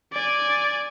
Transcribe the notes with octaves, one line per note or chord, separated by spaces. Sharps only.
D5 G#5